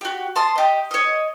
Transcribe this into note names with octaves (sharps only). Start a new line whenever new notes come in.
F#4 G4
A5 C6 D#6
G4 D#5
C#5 D#5